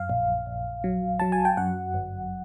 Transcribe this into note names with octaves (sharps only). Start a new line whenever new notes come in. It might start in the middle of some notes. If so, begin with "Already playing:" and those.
Already playing: F#2 F5
A#1
A#1
F#3
F#3 A5
G#5
G5
F#2 F#5
G1